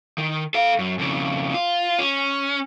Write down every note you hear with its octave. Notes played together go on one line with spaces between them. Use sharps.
D#3
A4 F5
F#2
F2 C#3
F4
C#4